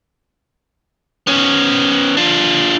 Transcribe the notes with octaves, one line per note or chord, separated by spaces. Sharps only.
B3 C#4
D4 F4